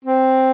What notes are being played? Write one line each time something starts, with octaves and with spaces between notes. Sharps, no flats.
C4